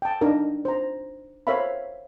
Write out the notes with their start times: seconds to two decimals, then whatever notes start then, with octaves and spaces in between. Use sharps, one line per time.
0.02 G5 A5
0.21 D4 D#4 A#4
0.65 C5 A#5
1.47 A#4 C5 C#5 E5 F5 B5